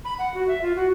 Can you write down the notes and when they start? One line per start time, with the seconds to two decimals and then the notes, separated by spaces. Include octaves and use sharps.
0.05 B5
0.19 F#5
0.34 F#4
0.48 E5
0.62 F4
0.76 F#4